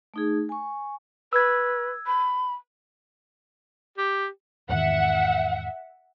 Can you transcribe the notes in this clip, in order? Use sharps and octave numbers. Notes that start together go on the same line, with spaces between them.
A3 D#4 G#4
G#5 C#6
B4 E6 G#6
B5
G4
E2 G#2 D#3 E5 F#5